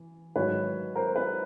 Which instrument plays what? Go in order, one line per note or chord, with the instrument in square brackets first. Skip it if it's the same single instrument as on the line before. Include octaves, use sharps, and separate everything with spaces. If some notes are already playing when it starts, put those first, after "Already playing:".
Already playing: [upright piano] E3
G#2 D#3 F#3 B4 C#5
A#4 C5
C5
B4